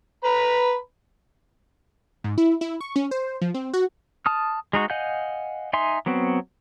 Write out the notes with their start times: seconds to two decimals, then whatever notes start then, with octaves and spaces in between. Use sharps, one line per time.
0.24 B4 A#5 B5
2.24 G#2
2.38 E4
2.61 E4
2.81 C#6
2.96 C#4
3.11 C5
3.41 F3
3.54 C4
3.73 F#4
4.26 A5 D#6 F6
4.73 G#3 D#4 F#4
4.90 D#5 F5 F#5 G#5 G6
5.73 D#4 E5 G#5 C6
6.06 F#3 B3 C4 F#4